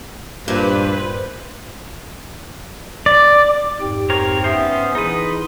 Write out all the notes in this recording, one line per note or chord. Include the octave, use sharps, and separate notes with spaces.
G2 A#2 B4 C5
D5
F2 G#2 G4 G5
C4 A#4 C#5
B3 C#4 C5 E5 D#6
E3 D#4 E4 G#4 B4 C6